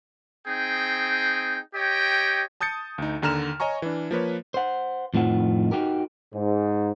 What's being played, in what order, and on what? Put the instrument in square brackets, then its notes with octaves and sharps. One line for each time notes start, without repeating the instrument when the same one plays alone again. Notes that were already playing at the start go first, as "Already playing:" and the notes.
[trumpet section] C4 D#4 G#4 G5
G4 C#5 D#5 G5
[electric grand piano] A5 D#6 G6 A6 C#7
D2 D#4
D#2 D3 A#5 F6 E7
C#5 D#5 G#5 A#5 C#6
E3 D4
F3 A#3 B4 C#5
[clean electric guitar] C5 F#5
F2 A2 D#3 F3 F#5
D#4 F#4 G4 A#4
[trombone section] G#2